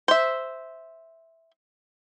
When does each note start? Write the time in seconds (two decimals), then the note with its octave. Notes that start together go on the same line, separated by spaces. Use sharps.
0.08 C5 E5